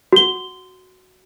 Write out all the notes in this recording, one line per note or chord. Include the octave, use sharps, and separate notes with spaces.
F#4 G7